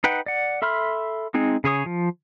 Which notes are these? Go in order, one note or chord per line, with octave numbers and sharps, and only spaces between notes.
D#4 B4 F#5 G5
D5 F#5
A4 E5 B5 C6 F6
G#3 C4 D#4 G#4
C#3 G#4 C#5 D#6
F3